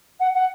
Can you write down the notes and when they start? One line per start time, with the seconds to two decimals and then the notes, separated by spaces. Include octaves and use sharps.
0.19 F#5
0.34 F#5